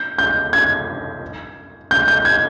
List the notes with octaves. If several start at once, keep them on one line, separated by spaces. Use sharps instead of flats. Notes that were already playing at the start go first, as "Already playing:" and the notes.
Already playing: G6
G6
G#6
G6
G6
G#6